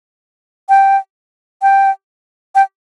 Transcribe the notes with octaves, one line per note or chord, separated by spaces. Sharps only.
G5
G5
G5